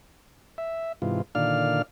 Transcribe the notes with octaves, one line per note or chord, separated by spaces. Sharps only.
E5
G#2 C3 E3 F4
A#2 D3 D#3 D5 F5 F6